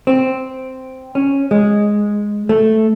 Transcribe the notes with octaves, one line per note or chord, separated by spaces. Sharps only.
C4
C#4
G#3
A3